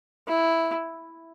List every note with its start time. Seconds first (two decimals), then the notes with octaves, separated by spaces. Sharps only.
0.28 E4